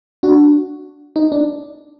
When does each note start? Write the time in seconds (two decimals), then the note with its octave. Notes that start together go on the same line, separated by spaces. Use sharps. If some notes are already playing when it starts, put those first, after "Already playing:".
0.23 D4 F#4
1.16 D#4
1.32 D4